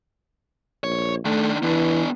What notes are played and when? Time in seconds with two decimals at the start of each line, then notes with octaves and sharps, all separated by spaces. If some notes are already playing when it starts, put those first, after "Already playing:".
0.84 A#1 C#5
1.25 D#3 A3 D4
1.63 E3 B3 D4